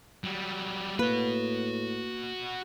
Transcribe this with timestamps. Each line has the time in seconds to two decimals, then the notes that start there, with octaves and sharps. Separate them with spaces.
0.24 F#3 G3
0.99 A2 A#3 F#4 B4 B5